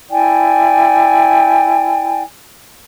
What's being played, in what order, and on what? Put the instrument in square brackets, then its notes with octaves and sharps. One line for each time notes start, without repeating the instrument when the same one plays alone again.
[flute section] E4 D5 G5 G#5